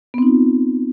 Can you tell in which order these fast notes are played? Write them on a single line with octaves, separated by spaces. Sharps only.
B3 C4 D#4 F4